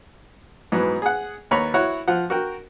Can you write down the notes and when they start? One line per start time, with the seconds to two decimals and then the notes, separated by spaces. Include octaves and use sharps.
0.72 G#2 E3 F#3 B3
1.02 G#4 F#5
1.51 D#2 B4 C#5 A#5 B5 C#6
1.74 E4 F#4 C#5 F#5
2.08 F3 F#5
2.30 F#4 A#4 G5